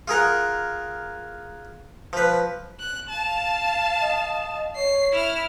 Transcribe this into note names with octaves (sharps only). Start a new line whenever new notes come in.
F4 G#4 A#4 F#5
F3 B4
F#6
F5 A5
D#5
C#5 C7
E4 F6